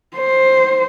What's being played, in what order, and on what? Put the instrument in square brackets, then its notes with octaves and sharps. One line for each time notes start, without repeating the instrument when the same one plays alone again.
[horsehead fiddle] C5